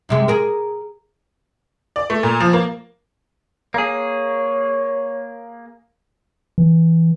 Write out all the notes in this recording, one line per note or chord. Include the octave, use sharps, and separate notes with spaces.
F#2 C3 G#3
G#4 A#4
D5
A3
A#2
F3
A#3
A#3 G#4 C#5
E3